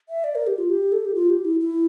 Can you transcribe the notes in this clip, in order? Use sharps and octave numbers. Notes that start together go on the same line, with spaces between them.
E5
D5
A#4
G4
F4
G4
A4
G4
F4
G4
E4
E4